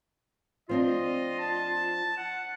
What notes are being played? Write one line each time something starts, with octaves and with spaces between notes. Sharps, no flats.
F3 C4 D4 F4 D#5
A5
F#5